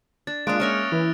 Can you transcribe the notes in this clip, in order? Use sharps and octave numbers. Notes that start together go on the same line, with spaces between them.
D4 A6
G#3 A#3 D4 F4 D#6 F#6 D7
A#3 C#4 E5 C#6 F6 A#6 F7
E3 E4